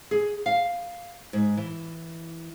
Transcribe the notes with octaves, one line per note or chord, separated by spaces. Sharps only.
G#4
F5
G#2
E3